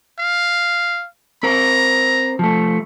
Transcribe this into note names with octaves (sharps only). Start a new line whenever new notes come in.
F5
C4 A#4 A#5
F3 A3